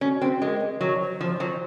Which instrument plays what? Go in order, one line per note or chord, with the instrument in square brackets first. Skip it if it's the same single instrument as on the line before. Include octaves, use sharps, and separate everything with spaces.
[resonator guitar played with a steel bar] C#4 [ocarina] F#4
[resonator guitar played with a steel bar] C4
[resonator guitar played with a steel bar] G#3 [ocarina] A#4
[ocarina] D#5
[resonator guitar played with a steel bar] F#3 [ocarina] C#5
[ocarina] C5
[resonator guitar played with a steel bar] F3
F#3